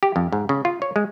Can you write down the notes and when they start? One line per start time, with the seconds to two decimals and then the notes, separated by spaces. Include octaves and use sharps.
0.03 G4
0.16 F2
0.32 G#2
0.49 C#3
0.65 F4
0.82 C#5
0.96 G#3